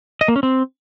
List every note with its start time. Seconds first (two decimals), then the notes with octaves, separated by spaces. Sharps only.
0.21 D#5
0.28 A#3
0.36 C#4
0.43 C4